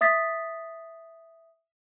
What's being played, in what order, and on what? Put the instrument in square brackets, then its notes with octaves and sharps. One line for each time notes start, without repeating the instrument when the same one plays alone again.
[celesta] E5 D#6 A6 B6